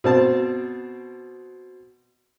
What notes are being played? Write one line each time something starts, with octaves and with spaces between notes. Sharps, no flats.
B2 C4 A5